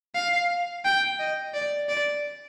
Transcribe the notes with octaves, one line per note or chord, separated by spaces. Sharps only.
F5
G5
D#5
D5
D5